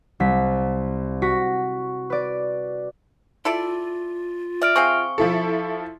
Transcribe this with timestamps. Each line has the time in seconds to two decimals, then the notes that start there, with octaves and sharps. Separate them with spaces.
0.20 C2 B6
1.22 F#4 A#6 B6
2.10 B4 D5
3.45 E4 F4 A4 D5
4.62 D5 E5 F6 D7
4.76 C4 G#4 F5 C#6
5.18 F3 E4 A4